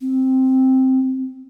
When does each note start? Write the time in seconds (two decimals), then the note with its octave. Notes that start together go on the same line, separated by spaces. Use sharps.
0.01 C4